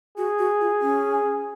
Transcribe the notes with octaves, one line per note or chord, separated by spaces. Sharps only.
F#4 G#4
F#4
F4
C#4